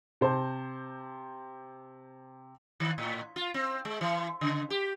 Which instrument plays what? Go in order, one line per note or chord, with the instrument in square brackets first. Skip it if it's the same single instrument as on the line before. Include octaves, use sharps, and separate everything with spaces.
[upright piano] C3 C5 A5
[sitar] D#3
A2
F4
C4
G#3
E3
C#3
G4